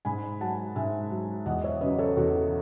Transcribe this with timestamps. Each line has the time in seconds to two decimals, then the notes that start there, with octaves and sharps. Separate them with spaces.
0.05 G#2 G#5 B5
0.41 F#3 F#5 A5
0.76 G#2 E5 G#5
1.11 F#3
1.46 E2 D#5 F#5
1.64 C#5 E5
1.81 C#3 F#3 B4 D#5
1.98 A4 C#5
2.17 E2 F#4 A4